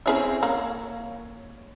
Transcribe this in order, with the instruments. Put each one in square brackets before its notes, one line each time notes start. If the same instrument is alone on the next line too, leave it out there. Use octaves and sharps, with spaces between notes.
[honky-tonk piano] C4 E4 C#5 [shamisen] C#4 G#4 E5
[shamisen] A#3 [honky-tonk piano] C#5